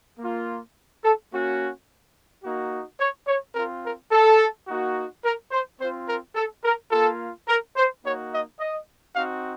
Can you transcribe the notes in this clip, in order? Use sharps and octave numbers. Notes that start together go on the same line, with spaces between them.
A#3 F4
A4
A#3 C#4 F#4
A#3 D#4 F#4
C#5
C#5
C4 F4 A#4
A#4
A4
A#3 D#4 F#4
A#4
C5
C4 F4 C5
A#4
A4
A#4
A#3 F4 A4
A#4
C5
A#3 D#4 F#4 C#5
D#5
D#5
C4 D#4 F#4 F5